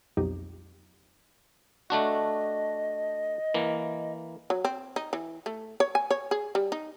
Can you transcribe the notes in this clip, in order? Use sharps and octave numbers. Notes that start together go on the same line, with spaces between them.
B1 F2 F#3 D#4 G4
A3 D4 F#4 D#5
E3 A#3
F#3
C4
D#4
E3
A3
C#5
G#5
C#5
G#4
G3
D#4